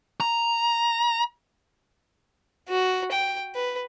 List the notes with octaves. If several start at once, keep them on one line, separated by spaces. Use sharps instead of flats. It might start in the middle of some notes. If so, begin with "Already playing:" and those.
A#5
F#4
G5
B4